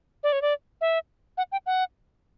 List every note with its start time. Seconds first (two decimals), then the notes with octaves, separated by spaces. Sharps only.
0.23 D5
0.32 C#5
0.42 D5
0.81 E5
1.38 F#5
1.52 G5
1.66 F#5